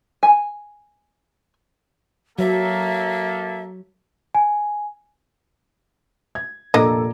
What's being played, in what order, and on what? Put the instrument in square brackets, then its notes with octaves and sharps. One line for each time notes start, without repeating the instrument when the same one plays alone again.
[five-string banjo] G#5
[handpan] F#3 [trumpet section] A#3 A4 [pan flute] E5
[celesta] G#5
[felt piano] G#6
[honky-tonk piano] F1 A4 [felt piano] A#2 A#5 D6 [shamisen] A#3 D4 D#5